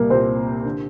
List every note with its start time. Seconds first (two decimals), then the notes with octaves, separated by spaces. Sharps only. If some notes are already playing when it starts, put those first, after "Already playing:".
Already playing: C2 A#2 G3 A#3 G4 A#4
0.10 C2 A#2 C4 C5
0.65 D3